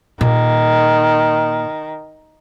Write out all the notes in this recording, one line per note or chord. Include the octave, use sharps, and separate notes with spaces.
A#2 D#3